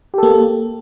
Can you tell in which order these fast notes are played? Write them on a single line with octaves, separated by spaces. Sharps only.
G4 A4 A#3